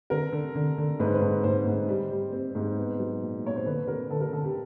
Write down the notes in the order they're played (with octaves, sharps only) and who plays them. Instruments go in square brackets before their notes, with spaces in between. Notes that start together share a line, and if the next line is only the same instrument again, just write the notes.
[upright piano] D3 A#4
D3
D3
D3
G#2 B4
C5
B4
G#2
G#2 C5
G#2
G3
G3
C4
G#2
B3
F#3
A#2
A#2 C#5
C5
D3 B4
D3 A#4
D3 A4
A#4
D3 A4
G4